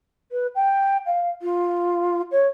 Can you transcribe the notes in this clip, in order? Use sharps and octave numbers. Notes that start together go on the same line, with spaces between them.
B4
G5
F5
F4
C#5